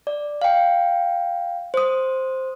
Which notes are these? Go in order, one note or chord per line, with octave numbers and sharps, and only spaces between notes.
D5
F5 G5
C5 D#6